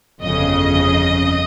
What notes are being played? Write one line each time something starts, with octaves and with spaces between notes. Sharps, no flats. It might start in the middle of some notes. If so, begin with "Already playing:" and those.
G1 F2 C#3 D#5